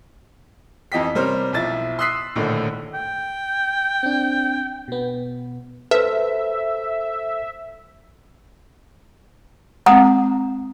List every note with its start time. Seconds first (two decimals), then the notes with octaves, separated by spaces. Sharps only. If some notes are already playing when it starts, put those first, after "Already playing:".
0.92 F2 E3 D#5 G5 B6
1.15 C3 G3 C#4 A#4 C5 F6
1.53 B1 F3 E4 A6
1.99 C6 D#6 E6 F#6 B6 C7
2.36 A#1 A2 D3 D#3
2.94 G5
4.03 C4 D4
4.88 B2 B3
5.91 A4 B4 C5 E5 E6
9.86 G#3 C4 F#5 A#5 D#6